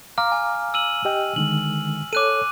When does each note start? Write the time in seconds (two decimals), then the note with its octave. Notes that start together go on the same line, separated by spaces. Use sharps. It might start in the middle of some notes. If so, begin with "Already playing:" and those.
0.18 F5 A#5 D6 F6
0.32 G#5
0.74 E6 D#7 F#7
1.05 G4 D#5 G5
1.36 D3 D#3 G#3 F#7
2.13 A4 C#5 D6 F#6 D#7